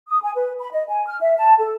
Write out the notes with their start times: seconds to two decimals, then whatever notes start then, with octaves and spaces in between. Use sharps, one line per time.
0.07 D#6
0.22 G#5
0.36 B4
0.59 B5
0.72 D#5
0.88 G#5
1.07 F6
1.21 E5
1.37 A5
1.59 A4